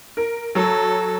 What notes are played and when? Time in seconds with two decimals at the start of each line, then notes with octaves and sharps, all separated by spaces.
0.17 A#4
0.55 F#3 A4